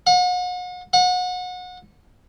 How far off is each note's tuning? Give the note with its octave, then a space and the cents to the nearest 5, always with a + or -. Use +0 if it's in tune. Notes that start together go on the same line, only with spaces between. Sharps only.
F#5 -40
F#5 -30